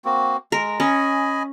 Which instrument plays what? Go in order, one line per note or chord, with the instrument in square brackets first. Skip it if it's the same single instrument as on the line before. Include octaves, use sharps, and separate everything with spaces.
[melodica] A#3 C4 F#4
[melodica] G#3 [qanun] A#4
[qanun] C#4 [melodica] D#5 G#5 B5